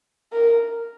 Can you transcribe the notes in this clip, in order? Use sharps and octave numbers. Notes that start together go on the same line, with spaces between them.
A#4